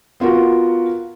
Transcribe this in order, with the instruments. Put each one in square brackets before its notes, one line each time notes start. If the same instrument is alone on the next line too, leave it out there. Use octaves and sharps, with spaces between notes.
[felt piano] B3 F4 F#4 A#4